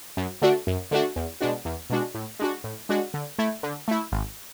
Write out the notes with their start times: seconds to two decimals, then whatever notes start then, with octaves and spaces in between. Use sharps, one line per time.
0.17 F#2
0.42 D3 A3 D4 F#4
0.67 F#2
0.91 D3 A3 D4 F#4
1.16 E2
1.41 B2 G#3 D4 F#4
1.65 E2
1.90 B2 G#3 D4 F#4
2.15 A2
2.39 G#3 D4 F#4
2.64 A2
2.89 G#3 D4 F#4
3.14 D3
3.39 A3 E4
3.63 D3
3.88 A3 E4
4.12 G#1